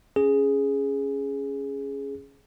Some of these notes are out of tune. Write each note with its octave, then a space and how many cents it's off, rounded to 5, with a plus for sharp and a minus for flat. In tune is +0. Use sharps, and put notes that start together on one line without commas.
C#4 +0 G#4 +0